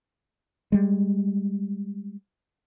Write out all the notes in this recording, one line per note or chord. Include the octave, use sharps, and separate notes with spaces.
G3 G#3